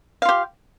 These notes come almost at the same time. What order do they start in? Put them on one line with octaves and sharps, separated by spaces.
F5 F4 G4